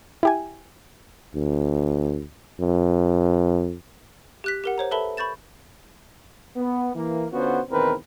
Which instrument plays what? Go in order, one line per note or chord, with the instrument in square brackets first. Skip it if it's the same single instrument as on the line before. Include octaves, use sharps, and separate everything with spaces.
[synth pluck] E4 G4 G#5
[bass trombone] D2
F2
[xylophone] G4 F#6 B6
G4 A#4 F#5
C5 C#5 A#5
A4 B4 E5 A5 B5 G7
B5 C#6 G6 A6 E7
[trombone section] B3
E3 A#3
D3 B3 C#4 F4 F#4 C5
B1 E2 D#3 C4 A#4 B4